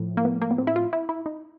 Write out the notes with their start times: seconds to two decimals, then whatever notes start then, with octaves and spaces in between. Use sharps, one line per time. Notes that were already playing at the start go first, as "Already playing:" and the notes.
Already playing: A2 F3
0.17 A#3
0.25 B3
0.42 A#3
0.51 B3
0.58 C4
0.67 E4
0.76 F4
0.93 E4
1.09 E4
1.26 D#4